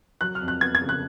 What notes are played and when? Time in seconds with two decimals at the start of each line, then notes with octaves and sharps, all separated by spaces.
0.21 F#3 F#6
0.35 F6
0.41 F2
0.48 F#6
0.61 B3 G#6
0.75 G#6
0.82 C#3
0.89 F#6